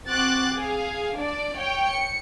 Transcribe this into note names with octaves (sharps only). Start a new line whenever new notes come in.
C4 F#4 D6 F#6 A6
G#4 F5
D4 D5
C#5 G5
C#7